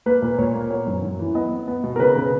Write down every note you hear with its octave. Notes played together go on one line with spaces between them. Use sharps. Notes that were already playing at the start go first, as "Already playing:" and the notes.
A#3 B4
A#2
A#2 C#5
A#3
B3 C#5
F#2
F#2
E3
B3 D#5
B3
B3
B2
A#4
C#3 B4
C#3